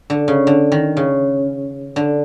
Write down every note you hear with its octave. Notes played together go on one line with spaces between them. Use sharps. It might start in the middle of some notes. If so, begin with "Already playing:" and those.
D3
C#3
D3
D#3
C#3
D3